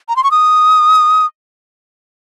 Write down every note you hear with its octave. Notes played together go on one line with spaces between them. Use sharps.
A#5
C6
C#6
D#6